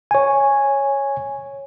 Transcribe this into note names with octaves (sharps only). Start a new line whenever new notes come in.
C#5 G#5